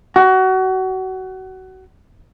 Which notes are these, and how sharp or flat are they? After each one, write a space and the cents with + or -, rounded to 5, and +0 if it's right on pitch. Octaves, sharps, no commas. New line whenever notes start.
F#4 +25